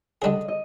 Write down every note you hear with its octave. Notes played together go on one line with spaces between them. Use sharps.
D3 G3 D4 G#4 D#5
D#5